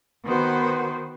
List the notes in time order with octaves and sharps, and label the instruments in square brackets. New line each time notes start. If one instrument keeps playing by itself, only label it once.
[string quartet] D#3 B3 F#4 B4 C5